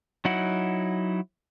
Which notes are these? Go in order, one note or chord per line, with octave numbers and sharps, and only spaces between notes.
F#3 D#4 E4 F#5